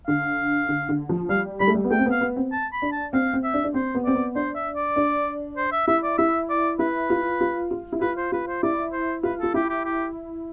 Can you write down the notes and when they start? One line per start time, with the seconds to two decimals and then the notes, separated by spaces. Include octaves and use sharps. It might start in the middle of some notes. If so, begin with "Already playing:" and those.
0.07 D3 F5
0.69 D3
0.89 D3
1.09 F3
1.29 G3 F5
1.60 G3 B5
1.68 A3
1.75 G3
1.84 B3
1.91 A3 G5
1.99 C4
2.06 B3
2.12 F5
2.21 B3
2.36 C4
2.52 A5
2.73 B5
2.82 D4
2.92 A5
3.13 C4 F5
3.34 C4
3.44 E5
3.54 D4
3.64 D4
3.74 C4 C5
3.95 B3
4.05 C4 D5
4.15 B3
4.35 D4 C5
4.55 E5
4.76 D5
4.96 D4
5.57 C5
5.72 E5
5.87 E4 E5
6.04 D5
6.18 E4 E5
6.50 D5
6.79 E4 B4
7.10 F4
7.41 F4
7.71 F4
7.92 E4
8.01 F4 B4
8.17 C5
8.32 F4 B4
8.47 C5
8.63 E4 D5
8.93 C5
9.23 F4 B4
9.40 F4 A4
9.54 E4 G4
9.70 G4
9.85 G4